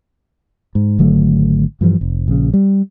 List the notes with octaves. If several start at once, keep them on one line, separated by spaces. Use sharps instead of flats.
G#2
G#1 D3 F#3 A3
G2 E3 F3 G3
F1
A#1 C#3
G3